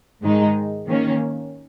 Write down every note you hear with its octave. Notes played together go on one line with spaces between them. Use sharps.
G#2 D#3 G#3 D#4
D#3 A#3 C#4